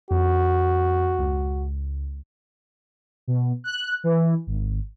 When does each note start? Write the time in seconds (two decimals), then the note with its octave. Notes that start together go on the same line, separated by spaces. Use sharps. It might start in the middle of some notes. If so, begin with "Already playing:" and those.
0.11 F2 F#4
1.19 C#2
3.28 B2
3.64 F#6
4.04 E3
4.47 G#1